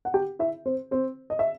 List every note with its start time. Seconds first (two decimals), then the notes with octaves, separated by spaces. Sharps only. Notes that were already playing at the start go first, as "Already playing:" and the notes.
0.05 F#5
0.14 G4 G5
0.39 E4 E5
0.66 C4 C5
0.91 C4 C5
1.30 D#5
1.39 E5